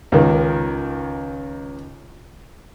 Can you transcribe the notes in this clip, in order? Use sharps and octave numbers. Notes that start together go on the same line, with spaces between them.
C#2 D#3